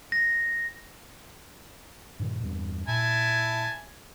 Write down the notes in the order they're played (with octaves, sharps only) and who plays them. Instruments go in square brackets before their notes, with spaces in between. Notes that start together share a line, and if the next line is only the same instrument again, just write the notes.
[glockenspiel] A#6
[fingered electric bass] G2 A#2 D#3
E2 G2
[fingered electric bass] A#2 [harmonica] E4 G#5 A5